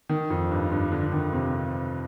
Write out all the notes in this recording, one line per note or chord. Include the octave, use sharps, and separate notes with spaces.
D#3
F2
G2
G2
D3
D#3
C3